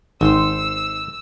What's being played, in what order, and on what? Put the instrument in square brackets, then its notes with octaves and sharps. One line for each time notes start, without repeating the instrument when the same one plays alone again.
[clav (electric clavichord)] G#1 [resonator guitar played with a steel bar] D#4 C5 [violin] E6